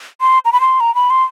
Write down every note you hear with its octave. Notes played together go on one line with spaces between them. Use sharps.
C6
A#5
B5
C6
A#5
B5
C6